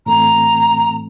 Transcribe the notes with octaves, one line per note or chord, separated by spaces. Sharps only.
A2 E3 A3 C4 A#5